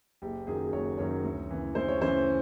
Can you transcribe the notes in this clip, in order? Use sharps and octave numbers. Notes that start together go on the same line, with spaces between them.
F#1 G4
F#2 D#3 F#3 G#4
F#1 C#5
F#2 D#3 F#3 C#5
D2
C#3 E3
D2 C5
C#5
C#3 E3 C5